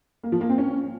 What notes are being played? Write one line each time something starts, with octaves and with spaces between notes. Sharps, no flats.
A#3
F3
A#3
C4
C#4